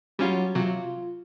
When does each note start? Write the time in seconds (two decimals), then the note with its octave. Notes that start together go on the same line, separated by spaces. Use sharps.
0.19 F#3 G3 C#4 F4
0.55 C3 F#3 F4